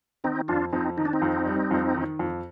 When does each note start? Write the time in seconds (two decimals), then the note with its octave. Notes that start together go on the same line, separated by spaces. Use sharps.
0.24 D#3 C4 D#4
0.48 F2 D4 F4
0.73 F2 C4 D#4
0.97 D#3 D#4
1.05 D4
1.13 C4 D#4
1.22 F2
1.46 G3
1.71 F2
1.95 D#3
2.19 F2